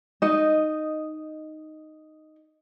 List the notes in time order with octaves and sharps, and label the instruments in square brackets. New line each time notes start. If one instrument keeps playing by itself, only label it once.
[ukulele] D#4 D#5